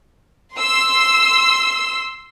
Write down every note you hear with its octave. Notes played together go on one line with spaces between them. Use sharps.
C6 E6